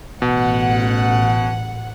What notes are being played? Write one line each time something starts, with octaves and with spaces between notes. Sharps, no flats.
A1 B2 F#5